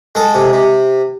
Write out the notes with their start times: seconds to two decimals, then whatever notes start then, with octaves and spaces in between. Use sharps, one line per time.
0.15 G#3 A4
0.35 C3
0.53 C3